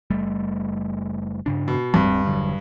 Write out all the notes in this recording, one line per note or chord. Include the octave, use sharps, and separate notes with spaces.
F#1 G3 A3
G2 C#3 D4
B2
D1 G2 C4
E1 D3 F#3